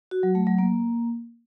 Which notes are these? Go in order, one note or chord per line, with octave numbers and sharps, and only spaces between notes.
F#4
F#3
A3
F#3
A#3